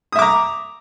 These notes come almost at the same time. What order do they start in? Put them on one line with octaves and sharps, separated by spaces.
D#6 E5 D6 A#5